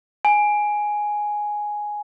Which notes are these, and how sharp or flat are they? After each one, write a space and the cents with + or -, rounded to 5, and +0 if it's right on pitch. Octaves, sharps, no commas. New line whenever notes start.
G#5 +5